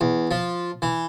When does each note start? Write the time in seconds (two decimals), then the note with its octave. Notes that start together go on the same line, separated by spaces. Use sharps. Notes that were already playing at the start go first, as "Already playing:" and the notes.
0.01 E2
0.31 F3
0.82 E3